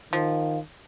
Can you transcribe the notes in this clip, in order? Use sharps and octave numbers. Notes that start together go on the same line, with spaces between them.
D#3 F3